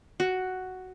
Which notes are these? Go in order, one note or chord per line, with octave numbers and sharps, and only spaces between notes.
F#4